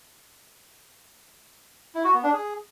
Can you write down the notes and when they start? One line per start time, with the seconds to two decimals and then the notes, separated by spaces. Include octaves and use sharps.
1.95 E4
2.05 F#4
2.14 B3
2.24 D4
2.33 G#4